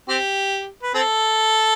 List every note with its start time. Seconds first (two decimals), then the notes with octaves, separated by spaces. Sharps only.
0.09 C4 G4
0.83 B4
0.94 C4 A4